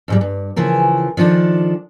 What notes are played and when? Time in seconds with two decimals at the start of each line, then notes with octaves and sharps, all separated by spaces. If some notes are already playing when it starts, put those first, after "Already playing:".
0.08 F2 G#2 G3
0.21 G2
0.56 C#3 E3 F3 A#4
1.17 D#3 F3 D4 A4